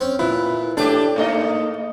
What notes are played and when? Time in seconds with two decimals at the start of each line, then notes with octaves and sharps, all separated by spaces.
0.01 C4 C#4
0.19 A#2 E3 E4 B4
0.77 A2 A3 D4 G4 G5 D6
1.16 G#2 A3 A#3 D#4 D#5